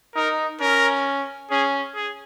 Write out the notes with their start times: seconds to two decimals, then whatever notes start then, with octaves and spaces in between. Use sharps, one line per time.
0.16 D#4 A#4
0.61 C#4 A#4
1.50 C#4 G#4
1.95 G#4